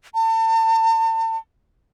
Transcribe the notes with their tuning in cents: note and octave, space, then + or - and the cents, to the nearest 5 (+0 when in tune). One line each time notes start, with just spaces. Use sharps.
A5 +40